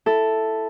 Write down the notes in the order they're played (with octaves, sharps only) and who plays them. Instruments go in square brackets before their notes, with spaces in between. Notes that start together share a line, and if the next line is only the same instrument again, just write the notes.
[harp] E4 A4